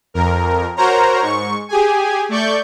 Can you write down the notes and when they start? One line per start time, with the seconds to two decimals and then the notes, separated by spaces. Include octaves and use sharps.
0.14 F2 A#4
0.76 F#4 A#4 C5 C#5 A#5
1.22 G#2 C#6
1.68 G4 G#4 G#5
2.29 A3 D5 C#6 G6